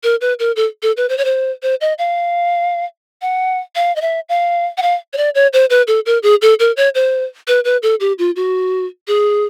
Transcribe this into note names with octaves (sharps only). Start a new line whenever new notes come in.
A#4
B4
A#4
A4
A4
B4
C5
C#5
C5
C5
D#5
F5
F#5
F5
D#5
E5
F5
F#5
F5
C#5
D5
C#5
C5
B4
A4
A#4
G#4
A4
A#4
C#5
C5
B4
B4
A4
G4
F4
F#4
G#4